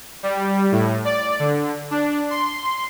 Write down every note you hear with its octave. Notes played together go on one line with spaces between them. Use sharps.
G3
A2
D5
D3
D4
C6